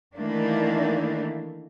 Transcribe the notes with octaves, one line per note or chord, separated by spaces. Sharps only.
D#3 E3 A3 A#3 D4